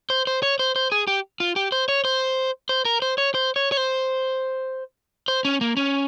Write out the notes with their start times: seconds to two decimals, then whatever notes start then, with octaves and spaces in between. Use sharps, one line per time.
0.10 C5
0.27 C5
0.43 C#5
0.59 C5
0.76 C5
0.92 G#4
1.07 G4
1.40 F4
1.56 G4
1.72 C5
1.89 C#5
2.05 C5
2.69 C5
2.85 A#4
3.02 C5
3.18 C#5
3.35 C5
3.56 C#5
3.72 C#5
3.77 C5
5.28 C5
5.45 C#4
5.61 A#3
5.77 C#4